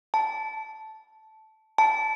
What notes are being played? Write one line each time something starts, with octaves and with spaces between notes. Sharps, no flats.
A5
A5